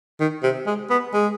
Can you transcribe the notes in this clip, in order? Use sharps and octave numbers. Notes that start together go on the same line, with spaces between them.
D#3
C3
G#3
B3
G#3